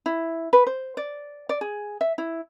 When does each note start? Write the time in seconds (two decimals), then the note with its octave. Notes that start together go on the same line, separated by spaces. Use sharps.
0.06 E4
0.53 B4
0.67 C5
0.97 D5
1.49 D5
1.61 G#4
2.01 E5
2.18 E4